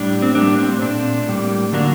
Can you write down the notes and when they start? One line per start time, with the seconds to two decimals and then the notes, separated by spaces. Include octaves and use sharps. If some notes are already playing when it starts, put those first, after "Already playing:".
Already playing: A2 G3 D4
0.22 C4
0.35 A2 G3 A#3 D4
0.58 C4
0.81 A#2 A3 C4 D4
1.28 A2 G3 A#3
1.73 D3 F#3 A#3 D4